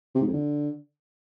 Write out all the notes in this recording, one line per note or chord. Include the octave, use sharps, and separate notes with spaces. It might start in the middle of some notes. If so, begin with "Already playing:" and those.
C3
G#2
F2
D3